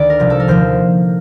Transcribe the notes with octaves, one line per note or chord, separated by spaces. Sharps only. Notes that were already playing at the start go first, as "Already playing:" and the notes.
Already playing: D2 D#3 D5
A#4
C2 C3 F3
A4
A#4
D#2 D3 F3 C5